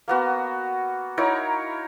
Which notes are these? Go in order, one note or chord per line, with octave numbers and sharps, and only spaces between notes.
A#3 B3 F#4
D#4 E4 A#4 C#5